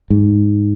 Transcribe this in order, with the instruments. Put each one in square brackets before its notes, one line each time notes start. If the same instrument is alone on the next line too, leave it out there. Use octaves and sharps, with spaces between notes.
[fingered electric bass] G#2